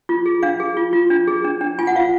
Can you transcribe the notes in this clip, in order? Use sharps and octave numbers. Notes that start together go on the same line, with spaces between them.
F4
G#4
D4 F5
G#4
F4
F4
D4
G#4
D4
D4
F4 G#5
F#5
F4 F5